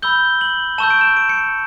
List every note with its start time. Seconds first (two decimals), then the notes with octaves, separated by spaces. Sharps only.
0.02 B5 E6 G6 G7
0.41 F#7
0.78 A5 C#6 E6 G6 E7
0.90 D7
1.01 E7
1.17 D7
1.29 C#7